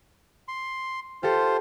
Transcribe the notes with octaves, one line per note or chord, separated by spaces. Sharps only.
C6
F4 G4 A4 C5